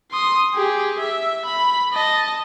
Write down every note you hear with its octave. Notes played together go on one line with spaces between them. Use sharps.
C6 D#6
G4 G#4
E5
B5
D#5 A5